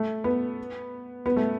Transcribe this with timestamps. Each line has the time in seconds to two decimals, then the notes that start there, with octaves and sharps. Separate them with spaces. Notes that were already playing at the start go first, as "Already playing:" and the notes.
Already playing: A3
0.24 B3
1.26 B3
1.36 A3